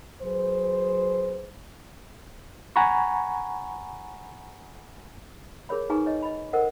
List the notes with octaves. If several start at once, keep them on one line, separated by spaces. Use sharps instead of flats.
F#3 G#4 B4 C5
F#5 G#5 A#5 B5 C#6
G#4 A#4 C#5 B5
D#4 G#4 B4 G#5 A#5 C#6
C#5 D#5
D#5 B5
A4 A#4 C5 D#5 F#5